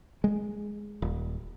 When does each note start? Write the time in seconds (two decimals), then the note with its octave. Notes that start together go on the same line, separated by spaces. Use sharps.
0.24 G#3
1.02 D#1